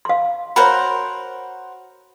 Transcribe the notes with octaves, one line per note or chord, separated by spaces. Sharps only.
F5 C6
F#4 A#4 C5 C#5 B5